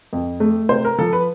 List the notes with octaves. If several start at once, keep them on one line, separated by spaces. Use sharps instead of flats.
F2
A3
C3 C5
A#4
F3 A4
B4